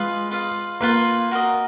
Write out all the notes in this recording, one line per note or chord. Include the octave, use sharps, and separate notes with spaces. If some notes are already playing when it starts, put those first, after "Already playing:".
Already playing: G#3 F4 B4 F5
F4 B4 F5
A#3 F4 B4 F5
F#4 A#4 D#5